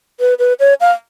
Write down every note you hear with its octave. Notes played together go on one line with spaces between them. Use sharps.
B4
B4
C#5
F5